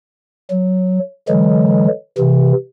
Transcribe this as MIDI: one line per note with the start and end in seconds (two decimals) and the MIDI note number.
0.51 0.99 54
1.29 1.87 50
1.29 1.87 52
1.29 1.87 54
1.29 1.87 56
2.18 2.52 48
2.18 2.52 52